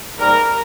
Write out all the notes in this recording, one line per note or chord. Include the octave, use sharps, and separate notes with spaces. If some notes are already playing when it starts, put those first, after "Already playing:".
G#2 G3 A#3 A#4